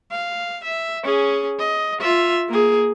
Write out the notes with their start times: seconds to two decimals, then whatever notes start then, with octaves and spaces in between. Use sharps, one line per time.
0.12 F5
0.64 E5
1.04 C#4 G#4
1.59 D#5
2.01 F4 E5
2.49 A#3 G#4